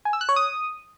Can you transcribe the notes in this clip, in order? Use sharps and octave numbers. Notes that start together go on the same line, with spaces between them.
G#5
E6
F#6
C#5
D#6